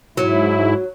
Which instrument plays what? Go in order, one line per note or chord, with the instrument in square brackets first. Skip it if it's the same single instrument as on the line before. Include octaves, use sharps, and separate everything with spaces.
[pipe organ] G#2 E4 [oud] F#3